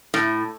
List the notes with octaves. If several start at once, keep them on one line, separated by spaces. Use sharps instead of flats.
A2